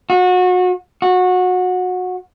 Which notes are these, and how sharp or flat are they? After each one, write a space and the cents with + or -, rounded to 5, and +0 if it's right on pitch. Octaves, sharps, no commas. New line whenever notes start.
F#4 -30
F#4 -20